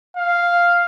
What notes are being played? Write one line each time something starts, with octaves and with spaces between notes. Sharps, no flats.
F5